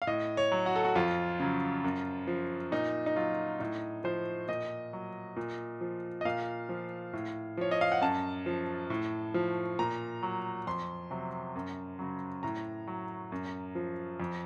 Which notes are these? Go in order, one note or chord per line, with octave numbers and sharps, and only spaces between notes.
F5
A2 D#5
C#5
F#3
F#4
A4
F#4
F2 F4
C#3 F#3
F#2
F3
A#2 D#4
D#4
F#3 F4
A2 D#4
F3 C5
A#2 D#5
F#3
A#2
F3
D#5
A#2 F5
F3
A2
F3 C#5
D#5
F5
F#5
F#2 A5
F3
A2
F3
A#2 A#5
F#3
F2 C6
C3 F#3
F#2
C#3 F#3
A2 A#5
F#3
F#2
F3
F2